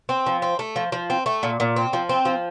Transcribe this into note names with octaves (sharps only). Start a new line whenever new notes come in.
C4
F3
C4
A3
F3
F3
C4
A3
A#2
A#2
C4
F3
C4
F3